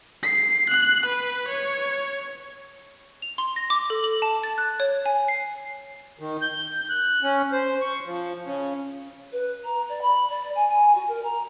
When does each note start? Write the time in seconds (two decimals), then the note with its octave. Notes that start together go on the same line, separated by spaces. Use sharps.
0.23 C7
0.70 F#6
1.06 B4
1.48 C#5
3.22 F7
3.38 C6
3.56 A#6
3.70 D6
3.90 A4
4.04 F#7
4.22 A5
4.43 A6
4.58 F#6
4.80 C#5
5.06 G#5
5.28 C7
6.19 D#3
6.41 G6
6.90 F#6
7.23 C#4
7.52 C5
7.81 C#6
8.05 F3
8.45 C#3
9.32 B4
9.64 A#5
9.89 D5
10.01 B5
10.29 D5
10.55 G#5
10.68 G#5
10.95 F#4
11.07 A#4
11.24 A#5